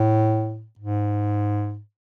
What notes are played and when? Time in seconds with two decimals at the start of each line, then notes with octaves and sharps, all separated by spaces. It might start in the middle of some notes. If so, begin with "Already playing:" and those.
Already playing: A2
0.79 G#2